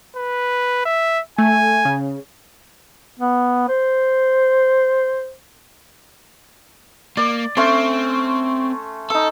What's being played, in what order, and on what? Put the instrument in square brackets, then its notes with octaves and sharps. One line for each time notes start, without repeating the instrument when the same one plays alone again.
[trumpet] B4
E5
[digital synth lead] A3 [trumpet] G#5
[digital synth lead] C#3
[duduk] B3
C5
[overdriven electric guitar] A#3 [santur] D5
[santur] A3 C#4 C6 [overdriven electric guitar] C4
[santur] D#4 E6 [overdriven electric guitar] A4